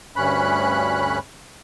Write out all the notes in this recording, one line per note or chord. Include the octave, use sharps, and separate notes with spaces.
D2 G2 C#4 B5 F#6